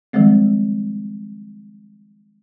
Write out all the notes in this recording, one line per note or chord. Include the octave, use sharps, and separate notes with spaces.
D#3 F3 G3 G#3 C4